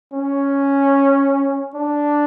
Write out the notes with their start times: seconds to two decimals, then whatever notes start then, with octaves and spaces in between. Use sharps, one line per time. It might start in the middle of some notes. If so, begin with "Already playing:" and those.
0.13 C#4
1.75 D4